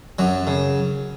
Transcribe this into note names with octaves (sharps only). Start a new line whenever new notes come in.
F#2 F#3
C#3